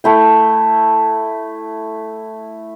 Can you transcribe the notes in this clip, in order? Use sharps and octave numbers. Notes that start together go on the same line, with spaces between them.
A3 E4 G5